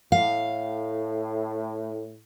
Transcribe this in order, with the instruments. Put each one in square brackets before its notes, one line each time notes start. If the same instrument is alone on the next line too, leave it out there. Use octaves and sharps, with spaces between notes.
[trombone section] A2 [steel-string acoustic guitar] F5